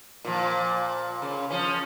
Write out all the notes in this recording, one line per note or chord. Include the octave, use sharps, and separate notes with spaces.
A#2 F3
C#3
F3 C#4